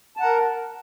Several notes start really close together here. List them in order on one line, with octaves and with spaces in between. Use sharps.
A5 F#5 A#5 A#4